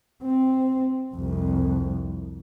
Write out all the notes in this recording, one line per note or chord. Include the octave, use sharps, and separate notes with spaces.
C4
C2 F2